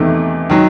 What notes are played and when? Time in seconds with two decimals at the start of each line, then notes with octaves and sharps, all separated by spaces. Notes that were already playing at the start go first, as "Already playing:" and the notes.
Already playing: E2 C3 D#3 A3
0.50 D#3 F#3